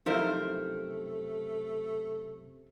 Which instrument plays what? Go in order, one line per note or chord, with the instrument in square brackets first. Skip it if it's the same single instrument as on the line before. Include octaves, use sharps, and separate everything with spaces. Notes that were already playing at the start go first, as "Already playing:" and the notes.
[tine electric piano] F#2 C3 [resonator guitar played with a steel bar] F3 A#4 C5 [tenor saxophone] A3 [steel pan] D#4 E4